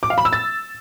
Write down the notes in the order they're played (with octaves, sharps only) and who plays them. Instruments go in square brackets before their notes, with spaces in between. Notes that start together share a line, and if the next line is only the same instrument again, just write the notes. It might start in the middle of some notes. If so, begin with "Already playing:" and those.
[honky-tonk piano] D6
F5
B5
E6
A6